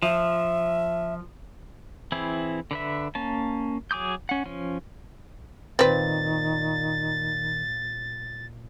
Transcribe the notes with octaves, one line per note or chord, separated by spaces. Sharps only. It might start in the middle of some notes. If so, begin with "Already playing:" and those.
F3 E5
E3 C4 E4 G#4
D3 B4 E5
A#3 C#4 A5
F#3 G#4 D6 D#6 G6
C#4 F#5
F3 C#4
A#2 D#3 C4 B4 A6